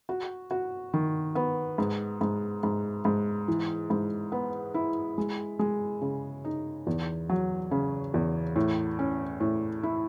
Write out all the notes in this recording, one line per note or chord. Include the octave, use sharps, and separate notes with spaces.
F#4
F#4
D#3
B3
G#2
G#2
G#2
G#2
E3
G#2
B3
E4
G#3
G#3
C#3
D#4
E2
F#3
C#3
E2
A2
C#4
A2
E4